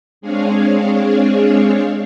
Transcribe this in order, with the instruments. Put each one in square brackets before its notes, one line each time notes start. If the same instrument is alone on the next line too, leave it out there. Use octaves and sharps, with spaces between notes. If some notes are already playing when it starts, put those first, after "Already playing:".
[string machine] G#3 C4 D4 G#4 C#5 F5